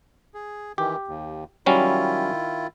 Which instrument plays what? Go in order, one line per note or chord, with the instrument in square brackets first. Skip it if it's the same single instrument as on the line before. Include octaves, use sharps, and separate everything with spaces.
[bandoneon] G#4
[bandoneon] D#3 E3 [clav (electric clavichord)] G4
[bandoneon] D#2
[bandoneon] D#3 E4 F4 [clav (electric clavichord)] F#3 G3 C#4